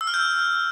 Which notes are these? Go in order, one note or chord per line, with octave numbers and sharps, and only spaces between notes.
E6
F6
G6